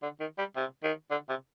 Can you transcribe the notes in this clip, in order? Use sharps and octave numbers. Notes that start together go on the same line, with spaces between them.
D3
D#3
G3
C3
D#3
D3
C3